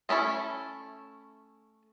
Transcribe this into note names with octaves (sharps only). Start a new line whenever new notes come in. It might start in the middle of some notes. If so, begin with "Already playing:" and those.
A3 C#4 E4 A4